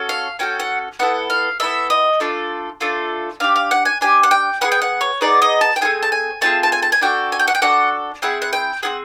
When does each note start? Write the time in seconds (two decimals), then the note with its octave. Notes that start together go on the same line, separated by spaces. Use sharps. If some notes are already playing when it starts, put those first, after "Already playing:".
Already playing: C#4 F#4 A4
0.09 F5
0.39 C#4 F#4 A4 G5
0.60 F#5
0.99 B3 E4 A4 F#5
1.30 F5
1.60 B3 E4 A4 E5
1.90 D#5
2.20 A3 D4 F4 A4
2.80 A3 D4 F4 A4
3.40 D4 G4 F5
3.56 F5
3.71 F#5
3.85 G#5
4.01 D4 G4 G#5
4.23 F#5
4.31 G5
4.61 B3 D#4 G#4 F#5
4.72 G5
4.82 F#5
5.01 C#5
5.21 B3 D#4 G#4 D5
5.42 D#5
5.61 A5
5.76 G5
5.81 A3 C4 F4 G#4 G#5
6.03 A5
6.12 G#5
6.41 A3 C4 F4 G#4 A5
6.63 A5
6.72 G#5
6.82 A5
6.92 G#5
7.01 D4 F#4 A4 G5
7.32 G#5
7.39 G5
7.48 F#5
7.55 G5
7.62 D4 F#4 A4 F#5
8.22 C4 E4 G#4 F#5
8.42 F#5
8.53 G5
8.83 C4 E4 G#4 F#5